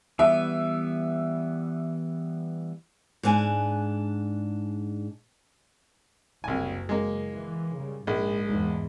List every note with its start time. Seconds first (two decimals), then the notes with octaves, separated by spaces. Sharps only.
0.19 E3 G3 B3 E5
3.23 G#2 D4 G#5
6.44 F#1 C2 G#5
6.89 G#3 A#3
7.35 E3
7.76 C#3 G3
8.07 A#1 G#2 G#3
8.47 E2 G#2